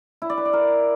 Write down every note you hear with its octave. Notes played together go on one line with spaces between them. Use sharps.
E4
D5
B4
D5
A#4